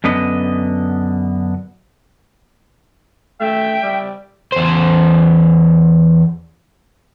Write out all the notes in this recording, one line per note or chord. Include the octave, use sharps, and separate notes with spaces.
F#2 D3 B3 D#5
A3 E5 G5
G3
E2 C5